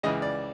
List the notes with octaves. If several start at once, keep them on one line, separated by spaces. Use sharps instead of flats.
C#2 C#3 E3 D#5
D5